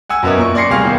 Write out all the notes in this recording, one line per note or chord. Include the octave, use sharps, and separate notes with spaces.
F#5 G#5 E6 G#6
F#2 B3 C#4 A#4 D#5 E5
A#2 C#6
D5 C6 C#6 A#6 C7 C#7
D2 C3 G3 G#4 F5 C#6
E2 D#3 E3